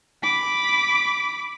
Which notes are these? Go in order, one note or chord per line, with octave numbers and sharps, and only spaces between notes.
B5 D6